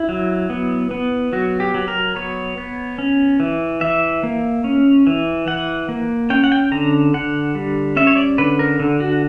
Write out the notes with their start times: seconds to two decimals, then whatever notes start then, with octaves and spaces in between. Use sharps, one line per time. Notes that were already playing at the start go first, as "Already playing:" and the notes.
Already playing: E4
0.09 F#3
0.50 B3
0.91 B3
1.33 F#3 F#4
1.60 G4
1.74 F#3
1.88 A#4
2.16 B3 C#5
2.58 B3
2.98 C#4
3.40 E3
3.81 E3 E5
4.23 A#3
4.64 C#4
5.07 E3
5.48 E3 F#5
5.89 A#3
6.30 C#4 G5
6.44 F#5
6.52 G5
6.72 D3 A#5
7.14 D3 F#5
7.55 G3
7.96 C#4 E5
8.07 C#5
8.17 D5
8.38 D3 B4
8.59 A#4
8.80 D3
9.00 F#4